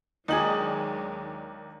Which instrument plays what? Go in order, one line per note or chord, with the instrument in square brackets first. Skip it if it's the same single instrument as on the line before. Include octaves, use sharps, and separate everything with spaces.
[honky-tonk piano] D#2 D4 F#7 [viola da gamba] F#3 G#3 [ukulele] D#4 G#4